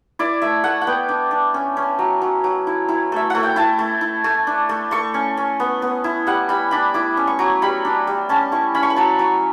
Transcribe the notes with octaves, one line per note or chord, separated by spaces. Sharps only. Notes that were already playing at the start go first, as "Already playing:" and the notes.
E4 D5
A3 E5
A3 F#5
F#5
B3 G5
D4
D4
C#4
C#4
F#3
F#3
F#3
E4
E4
A3 E5
A3 F#5
G5
E4 A5
A3
E4
A3
D4
A3
A3 C#6
C#4
C#4
B3
B3
E4
G3 F#5
G3 B5
D4 B5
E4 D6
C#4
C#6
F#3
G3 B5
D4
G3
C#4 A5
E4 C#6
C#4 B5
C#6
B5
F#3 A5
F#3